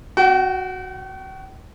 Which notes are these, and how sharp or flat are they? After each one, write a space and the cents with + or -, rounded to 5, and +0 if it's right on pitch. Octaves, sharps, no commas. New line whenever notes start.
F#4 +0 G5 -40